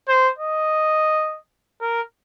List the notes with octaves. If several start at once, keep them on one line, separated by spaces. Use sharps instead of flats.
C5
D#5
A#4